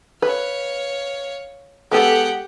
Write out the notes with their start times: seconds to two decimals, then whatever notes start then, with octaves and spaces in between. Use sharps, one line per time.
0.22 B4 C#5 F5
1.92 G#3 B3 G4 A4 F#5